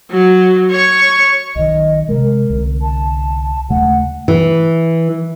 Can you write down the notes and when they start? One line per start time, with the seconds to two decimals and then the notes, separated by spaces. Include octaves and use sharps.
0.10 F#3
0.71 C#5 C#6
1.56 B1 D#3 D#5
2.09 C3 G#3 A#4
2.50 C2 D3
2.82 A5
3.70 D#2 C#3 A3 F#5
4.28 E3